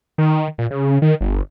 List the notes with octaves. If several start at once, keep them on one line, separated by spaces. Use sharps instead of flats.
D#3
A#2
C#3
D#3
G1